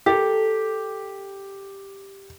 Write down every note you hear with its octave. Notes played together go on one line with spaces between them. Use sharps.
G4 A4 A#4